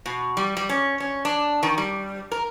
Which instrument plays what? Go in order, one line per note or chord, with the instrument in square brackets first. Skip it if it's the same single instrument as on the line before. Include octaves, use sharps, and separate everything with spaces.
[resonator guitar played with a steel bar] B2
G3
G3
C#4
C#4
D4
D#3
G3
A#4